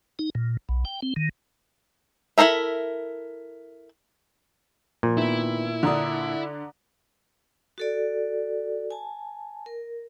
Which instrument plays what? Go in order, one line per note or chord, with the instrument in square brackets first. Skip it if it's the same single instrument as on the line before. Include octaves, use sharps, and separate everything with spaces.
[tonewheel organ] D#4
A#2
B1
G5
C4
D#3
[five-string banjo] E4 F4 A4 A#4 E5
[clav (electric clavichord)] A#2 [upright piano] F3
[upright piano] D#3 B3 [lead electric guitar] E4
[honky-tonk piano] D3 D4 [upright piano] D5 A#5 D#6
[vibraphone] F#4 A4 D5
G#5 A5
A#4